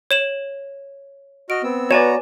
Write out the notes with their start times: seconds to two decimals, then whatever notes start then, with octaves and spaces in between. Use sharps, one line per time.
0.11 C#5 E7 F#7
1.50 F#4 D#5 F6 D7
1.63 B3 C4 E6
1.91 B3 F#4 B4 C#5 D5 G#5 A#5 E7